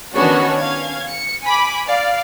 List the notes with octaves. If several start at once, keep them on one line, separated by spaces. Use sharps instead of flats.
D#3 B3 C#4 D4 F#4 C#5
C#4 F5 G#6
C#7
G#5 B5 D6
D5 F5